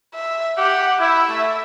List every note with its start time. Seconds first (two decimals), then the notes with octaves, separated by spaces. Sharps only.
0.14 E5
0.57 G4 F#5
1.00 E4 E5
1.29 A3